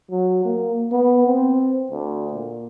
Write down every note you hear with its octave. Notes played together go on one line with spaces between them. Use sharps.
F#3
A#3
B3
C4
D2
A#2